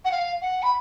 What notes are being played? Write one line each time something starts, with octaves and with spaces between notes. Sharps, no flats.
F#5
F5
F#5
B5